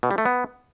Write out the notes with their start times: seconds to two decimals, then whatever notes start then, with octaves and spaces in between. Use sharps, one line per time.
0.03 B2
0.11 G3
0.18 A3
0.26 B3